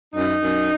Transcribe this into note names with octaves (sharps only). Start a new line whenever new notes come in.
F#2 D#4
F#2